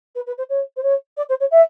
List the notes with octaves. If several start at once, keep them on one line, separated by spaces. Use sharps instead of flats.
B4
B4
C5
C#5
C5
C#5
D5
C5
C#5
E5